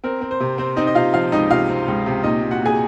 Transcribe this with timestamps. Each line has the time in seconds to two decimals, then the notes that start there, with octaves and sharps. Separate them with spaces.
0.04 C4 A#4
0.21 C4
0.31 C5
0.40 C3
0.58 C4 C5
0.76 C4 D#4 D#5
0.87 D#5
0.95 C3 F4 F5
1.13 F3 F4 F5
1.32 C#2 D#4 D#5
1.50 C3 F4 F5
1.68 C4
1.88 C#2
2.06 C3
2.23 A#2 D#4 D#5
2.42 A#2
2.51 F#4 F#5
2.61 A#2 G#4 G#5